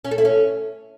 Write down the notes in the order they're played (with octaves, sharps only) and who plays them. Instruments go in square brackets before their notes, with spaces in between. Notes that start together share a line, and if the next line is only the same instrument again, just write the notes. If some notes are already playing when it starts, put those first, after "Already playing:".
[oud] C#4
A4
E4
C#4